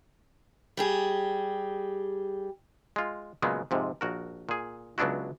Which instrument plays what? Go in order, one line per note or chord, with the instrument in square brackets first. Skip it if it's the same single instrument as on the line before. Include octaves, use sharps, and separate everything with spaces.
[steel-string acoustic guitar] G3 G4 G#4
[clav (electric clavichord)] G#3 F4
A#2 C#3 F#3 G#3 B3
F2 G#2 C3
A#1 F#4 A#4
A#2 G#4
C#2 F#3 B3 D4 E4 F#4